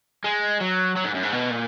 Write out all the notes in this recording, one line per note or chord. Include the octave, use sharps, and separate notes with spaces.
G#3
F#3
F#3
G#2
F#2
G#2
B2
A#2